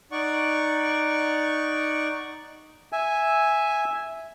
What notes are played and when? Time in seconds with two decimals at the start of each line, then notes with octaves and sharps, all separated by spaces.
0.12 D#4 D5 F#5 C#6
2.92 E5 G#5